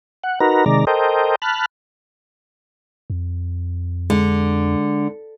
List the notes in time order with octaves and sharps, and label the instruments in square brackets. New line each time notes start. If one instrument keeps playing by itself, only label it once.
[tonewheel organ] F#5
D#4 F#4 A#4 B4 A#5
C3 D#3 G#3 D5 A#5
A4 A#4 C5 D#5 G5
A5 B5 F6 F#6
[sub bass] F2
[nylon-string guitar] D3 [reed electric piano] G#3